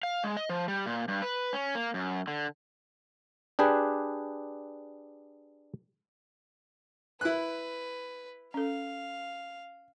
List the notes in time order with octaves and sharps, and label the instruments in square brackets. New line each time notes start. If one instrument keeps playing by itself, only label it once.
[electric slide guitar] F5
G#3
D#5
F3
G3
A#2
G2
B4
C#4
A#3
F#2
D3
[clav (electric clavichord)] D4 G4 G#4 B4
[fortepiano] E4 F#6 [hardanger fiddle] B4
[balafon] C#4 A4 [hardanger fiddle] F5